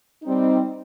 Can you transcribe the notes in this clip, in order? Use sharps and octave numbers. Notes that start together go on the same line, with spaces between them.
G3 C4 D#4